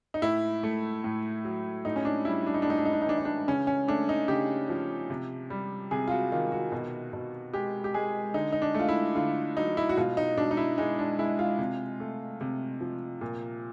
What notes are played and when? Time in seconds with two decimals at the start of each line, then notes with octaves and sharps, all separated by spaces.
0.14 D#4
0.22 A2 E4
0.63 A3
1.04 A2
1.45 F#3
1.85 A2 D#4
1.96 C#4
2.05 D4
2.25 G3 E4
2.47 D4
2.54 D#4
2.62 D4
2.67 A2 D#4
2.78 D4
2.85 D#4
2.93 D4
3.02 D#4
3.07 E3 D4
3.18 D#4
3.25 D4
3.48 C#3 C#4
3.67 C#4
3.88 A3 D4
4.09 D#4
4.28 C#3 G4
4.70 F3
5.10 C3
5.50 G3
5.91 C3 G#4
6.08 F4
6.11 F#4
6.32 D#3 F4
6.52 F#4
6.72 B2
7.13 B2
7.54 G#3 G4
7.84 G4
7.94 G#3 G#4
8.34 D3 D#4
8.52 D#4
8.62 D4
8.75 A3 F4
8.88 E4
9.15 D3 F4
9.57 F#3 D#4
9.77 E4
9.89 F#4
9.97 B2 F4
10.17 D#4
10.37 B2 D4
10.51 D#4
10.57 E4
10.78 G#3 D#4
10.99 D4
11.19 G#3 E4
11.39 F4
11.59 C3
12.00 A3
12.41 C3
12.81 F3
13.21 A#2